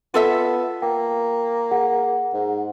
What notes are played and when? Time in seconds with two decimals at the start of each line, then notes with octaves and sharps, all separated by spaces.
0.14 B3 F4 A4 E5
0.82 A#3 G5
1.71 G#4 F#5
2.34 G#2